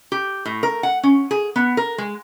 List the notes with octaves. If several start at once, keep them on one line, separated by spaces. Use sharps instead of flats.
G4
A2
A#4
F#5
C#4
G#4
B3
A#4
G#3